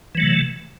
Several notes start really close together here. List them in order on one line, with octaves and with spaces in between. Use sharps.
E3 F#3 A3 C3